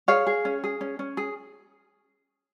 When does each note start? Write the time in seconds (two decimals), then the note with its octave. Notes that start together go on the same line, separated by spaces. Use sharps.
0.08 G#4 C#5 F5
0.27 G#4
0.45 C#4
0.64 G#4
0.81 C#4
0.99 C#4
1.17 G#4